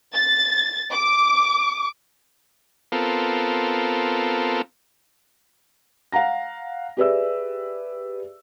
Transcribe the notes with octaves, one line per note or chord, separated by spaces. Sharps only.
A6
D6
B3 C4 F4 A4 A#4
F5 F#5 A#5 A#6
G4 G#4 B4 D5 E5 E6